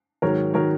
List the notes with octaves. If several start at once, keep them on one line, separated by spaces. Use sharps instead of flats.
G#2 D#3 F#3 A#4 C#5
D#3 F#3 A#4 C#5